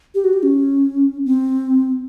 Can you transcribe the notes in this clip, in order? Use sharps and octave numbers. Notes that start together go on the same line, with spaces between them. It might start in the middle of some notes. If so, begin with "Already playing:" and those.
G4
F#4
G4
C#4
C4